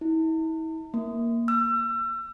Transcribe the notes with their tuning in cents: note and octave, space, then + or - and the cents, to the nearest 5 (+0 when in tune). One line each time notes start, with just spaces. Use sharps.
E4 -40
A#3 +5
E6 +35